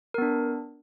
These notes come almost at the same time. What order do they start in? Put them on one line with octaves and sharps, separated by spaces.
A#4 B3 D4